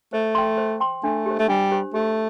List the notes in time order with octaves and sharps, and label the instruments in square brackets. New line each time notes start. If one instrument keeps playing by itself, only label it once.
[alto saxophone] A3 [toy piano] C5
[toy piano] G5 C6
C5
G5 C6
[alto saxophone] A3 [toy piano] D4
[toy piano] G4 C5
[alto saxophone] A3
[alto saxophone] G3 [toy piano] D4
[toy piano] G4 C5
[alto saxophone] A3 [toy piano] G4